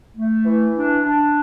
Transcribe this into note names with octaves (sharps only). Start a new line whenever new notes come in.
A3
E3
D4
D4